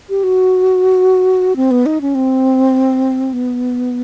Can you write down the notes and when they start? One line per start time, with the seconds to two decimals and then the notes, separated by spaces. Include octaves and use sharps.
0.09 G4
0.24 F#4
1.56 C4
1.71 B3
1.86 D#4
2.01 C#4
2.15 C4
3.33 B3